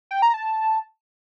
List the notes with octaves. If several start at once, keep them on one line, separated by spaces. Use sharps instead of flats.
G5
A#5
A5